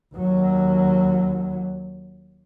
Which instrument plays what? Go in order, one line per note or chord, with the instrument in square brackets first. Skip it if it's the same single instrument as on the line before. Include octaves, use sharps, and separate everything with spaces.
[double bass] D#2 F#3